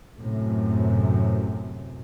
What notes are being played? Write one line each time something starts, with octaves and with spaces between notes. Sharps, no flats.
F#2 A2 C3